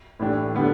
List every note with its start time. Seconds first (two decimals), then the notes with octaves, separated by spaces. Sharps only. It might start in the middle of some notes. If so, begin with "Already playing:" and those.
0.19 A2 E3 A3 D4 G4
0.54 D3 G3 B3 D4